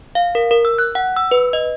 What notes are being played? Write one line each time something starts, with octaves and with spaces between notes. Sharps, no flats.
F5
A#4
A#4
E6
F#6
F#5
E6
B4
D#5